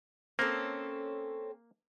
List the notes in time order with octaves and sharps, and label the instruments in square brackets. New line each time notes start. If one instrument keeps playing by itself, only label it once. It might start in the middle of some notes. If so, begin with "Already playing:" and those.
[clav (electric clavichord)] A#3 [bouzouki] C4 C#4 A4